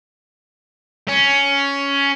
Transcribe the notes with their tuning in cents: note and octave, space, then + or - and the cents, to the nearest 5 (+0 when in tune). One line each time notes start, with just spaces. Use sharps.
C#4 +10